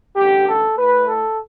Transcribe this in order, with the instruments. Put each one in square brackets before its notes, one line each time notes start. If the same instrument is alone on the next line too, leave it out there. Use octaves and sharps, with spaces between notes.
[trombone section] A1 G2 D3 G4
A4
A2 A3 B4
A4